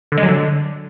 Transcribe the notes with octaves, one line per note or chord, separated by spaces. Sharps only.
D3
G#3
F#3
D3